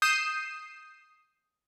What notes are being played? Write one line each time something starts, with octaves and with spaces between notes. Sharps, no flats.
D#6 G6 C7 D#7 E7